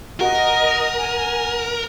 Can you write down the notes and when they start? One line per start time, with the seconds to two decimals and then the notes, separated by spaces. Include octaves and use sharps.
0.21 F#4 A#4 D#5
0.98 G#5